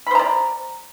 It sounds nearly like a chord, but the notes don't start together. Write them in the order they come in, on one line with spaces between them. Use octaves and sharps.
B5 C5 A#5 D5